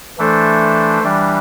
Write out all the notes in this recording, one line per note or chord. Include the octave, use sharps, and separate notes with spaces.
E3 A3 D4 A4 C5
E3 G3 D4